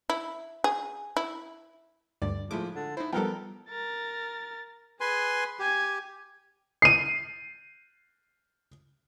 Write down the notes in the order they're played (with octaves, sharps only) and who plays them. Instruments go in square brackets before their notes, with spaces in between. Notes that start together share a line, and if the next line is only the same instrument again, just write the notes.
[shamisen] E4
G#4
E4
[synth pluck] D2 G2 [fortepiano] D5
[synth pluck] A2 E4 D6 [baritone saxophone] F3 [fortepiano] G#3
[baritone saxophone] D3
[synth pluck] D#4 C5 [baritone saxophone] E4
[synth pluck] F3 G3 [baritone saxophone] B3 [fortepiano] A4 A#4 G5
[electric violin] A#4 A6
[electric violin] G#4 [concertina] B4 G#5 C6
[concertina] G4 [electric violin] G#5 G#6
[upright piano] C7 D#7